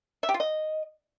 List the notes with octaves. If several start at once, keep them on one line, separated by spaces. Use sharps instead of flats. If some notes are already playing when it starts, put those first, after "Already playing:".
E5
G4
F4
D#5